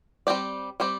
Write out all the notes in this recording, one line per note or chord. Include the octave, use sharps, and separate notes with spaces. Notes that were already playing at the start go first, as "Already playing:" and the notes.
G3 C4 G4 D5
G3 C4 G4 D5